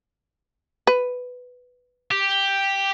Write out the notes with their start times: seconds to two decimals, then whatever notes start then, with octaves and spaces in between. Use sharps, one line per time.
0.87 B4
2.11 G4